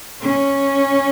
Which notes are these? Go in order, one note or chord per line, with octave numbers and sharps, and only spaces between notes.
C#4